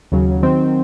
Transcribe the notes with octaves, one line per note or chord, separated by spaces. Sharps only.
D#2 C#3 F#3
D#3 F#3 C4